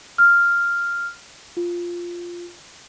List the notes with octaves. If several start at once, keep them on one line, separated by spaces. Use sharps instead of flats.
F6
F4